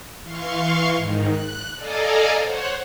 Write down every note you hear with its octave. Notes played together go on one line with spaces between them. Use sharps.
E3 F5 C6 C#6
G#2 D#3
F#6
A4 D5 D#5 F5 G#5 A#5
C5 C#5 F#5